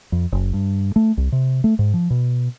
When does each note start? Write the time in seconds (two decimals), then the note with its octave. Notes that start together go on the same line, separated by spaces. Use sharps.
0.12 F2
0.32 F#1
0.53 G2
0.96 A3
1.17 C2
1.32 C3
1.64 A3
1.79 G#2
1.94 F3
2.10 B2